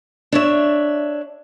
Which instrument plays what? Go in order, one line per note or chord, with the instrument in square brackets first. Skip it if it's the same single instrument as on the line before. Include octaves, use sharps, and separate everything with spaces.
[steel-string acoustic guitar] D4 C#5 E5